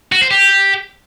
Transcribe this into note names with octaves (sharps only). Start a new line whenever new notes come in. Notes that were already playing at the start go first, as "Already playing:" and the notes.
F#4
C5
G4